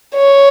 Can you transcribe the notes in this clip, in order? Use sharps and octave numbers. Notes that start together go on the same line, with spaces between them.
C#5